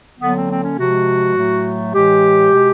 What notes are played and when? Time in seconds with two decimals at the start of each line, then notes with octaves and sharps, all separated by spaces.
0.21 D3 F#3 A#3 B3
0.36 C4
0.50 C4
0.64 C#4
0.78 C3 F3 G#3 F#4
1.36 A2 F#3 A3
1.93 A2 E3 G#3 G4
2.51 B2 G#3